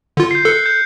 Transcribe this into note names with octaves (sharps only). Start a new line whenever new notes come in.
D3 F4
G6 C7
A4 F#6 C#7
G6